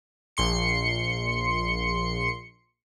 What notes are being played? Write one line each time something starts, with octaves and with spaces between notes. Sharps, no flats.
A#1 C6 C#7